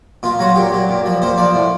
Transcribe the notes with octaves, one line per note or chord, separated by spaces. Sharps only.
A#2 F4
F#3 F#4
A#2 G4
F#3
A#2
F3
A#2 C5
F3 D5
A2